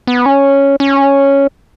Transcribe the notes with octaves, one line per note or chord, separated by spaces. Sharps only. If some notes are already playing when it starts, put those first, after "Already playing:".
B3
C#4
C#4